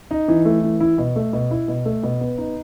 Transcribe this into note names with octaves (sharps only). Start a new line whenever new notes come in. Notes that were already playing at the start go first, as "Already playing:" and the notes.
D#4
E3
A3
E3
E4
B2
A3
B2
E4
B2
A3
B2
B3
D#4